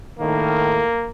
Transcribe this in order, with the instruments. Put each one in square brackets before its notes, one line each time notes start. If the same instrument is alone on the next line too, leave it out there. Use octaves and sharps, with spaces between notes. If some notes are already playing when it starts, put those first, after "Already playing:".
[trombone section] A2 D#3 [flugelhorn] A#3